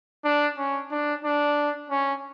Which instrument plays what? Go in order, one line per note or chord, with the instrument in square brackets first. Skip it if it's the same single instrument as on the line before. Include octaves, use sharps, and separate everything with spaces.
[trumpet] D4
C#4
D4
D4
C#4